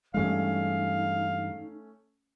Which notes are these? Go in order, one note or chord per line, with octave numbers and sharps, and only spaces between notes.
G2 E3 G#3 A3 C#4 D#4 F5